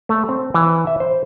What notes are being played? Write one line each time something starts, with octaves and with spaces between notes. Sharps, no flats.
A3
C4
E3
E5
C5